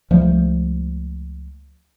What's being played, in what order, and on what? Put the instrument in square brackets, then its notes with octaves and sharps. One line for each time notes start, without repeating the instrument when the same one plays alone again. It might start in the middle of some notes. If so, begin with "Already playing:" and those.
[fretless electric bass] C#2 F3 G3 A3